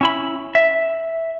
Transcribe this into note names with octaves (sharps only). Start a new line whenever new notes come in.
C#4 E4 B5
E5